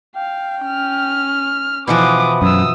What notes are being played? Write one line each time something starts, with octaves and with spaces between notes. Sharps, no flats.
F5 G5
C#4 F6
B2 E3 F3 B4 D6 D#6
F#2 D#6 E6